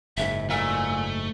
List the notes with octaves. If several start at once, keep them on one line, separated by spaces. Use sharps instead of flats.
F#1 G#2 E5
A#2 A3 A#4 E5 G#5